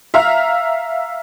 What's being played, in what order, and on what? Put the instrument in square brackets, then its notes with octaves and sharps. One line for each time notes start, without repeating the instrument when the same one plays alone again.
[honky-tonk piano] E5 F5 A#5 F6